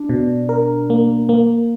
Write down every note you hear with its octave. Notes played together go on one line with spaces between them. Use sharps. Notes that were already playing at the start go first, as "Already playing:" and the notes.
Already playing: D4
B2
A#4
A#3
A#3